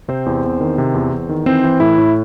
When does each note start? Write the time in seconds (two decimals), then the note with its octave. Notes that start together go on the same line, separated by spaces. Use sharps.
0.08 C3 C4 C5
0.26 E2
0.44 E2
0.61 D#3
0.78 C3
0.94 E2
1.12 E2
1.29 D#3
1.46 E3 C4 C5
1.64 E3
1.80 A2 E4
1.98 A2